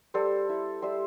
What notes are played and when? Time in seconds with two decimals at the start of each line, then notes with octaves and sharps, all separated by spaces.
0.14 G3 A4 C5
0.49 E4
0.82 G3 C5 E5